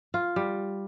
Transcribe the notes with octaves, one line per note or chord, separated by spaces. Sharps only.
F4
G3